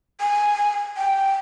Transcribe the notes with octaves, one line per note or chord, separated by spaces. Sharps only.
G#5
G5